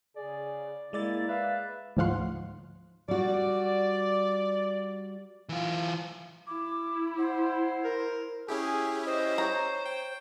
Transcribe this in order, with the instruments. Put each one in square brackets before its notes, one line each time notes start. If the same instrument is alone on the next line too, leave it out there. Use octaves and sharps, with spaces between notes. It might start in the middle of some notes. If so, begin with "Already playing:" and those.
[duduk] C#3 [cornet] G#4 [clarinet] D5
[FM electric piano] G#3 D5 A6 [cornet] A#3 [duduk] E4
[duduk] B4 [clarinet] E5 [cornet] F5
[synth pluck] D2 G#2 F3 F5 F#5 C6
[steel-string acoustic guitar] G3 F#4 [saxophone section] D5
[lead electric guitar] E3 F4
[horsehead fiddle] E4 [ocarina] D6
[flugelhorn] C5 [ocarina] F#5
[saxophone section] A#4
[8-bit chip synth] C#4 E4 G4 [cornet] G#4
[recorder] C5 [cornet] D#5
[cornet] C#5 [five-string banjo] A#5
[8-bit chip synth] G5